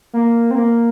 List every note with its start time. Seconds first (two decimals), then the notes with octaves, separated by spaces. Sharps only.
0.13 A#3
0.51 C4
0.55 A#3